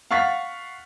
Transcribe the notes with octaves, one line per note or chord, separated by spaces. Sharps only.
F5 F#5 C#6 A6 B6